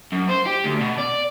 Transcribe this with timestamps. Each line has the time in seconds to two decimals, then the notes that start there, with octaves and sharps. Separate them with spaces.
0.12 F#2
0.29 C5
0.46 G4
0.64 D2
0.80 B2
0.98 D5